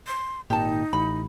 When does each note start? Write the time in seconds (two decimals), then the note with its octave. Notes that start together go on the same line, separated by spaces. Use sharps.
0.07 C6
0.50 G#1 A#2 D#3 D#4 G4 A5
0.93 A1 B5